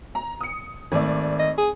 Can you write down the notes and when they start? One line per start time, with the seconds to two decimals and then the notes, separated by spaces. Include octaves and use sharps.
0.15 A#5
0.41 D#6 C#7
0.92 G#1 A3 D5
1.39 D#5
1.58 G#4